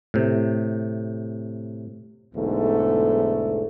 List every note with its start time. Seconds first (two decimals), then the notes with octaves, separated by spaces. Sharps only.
0.14 A2 C3
2.34 B1 E2 G#2 D3 A3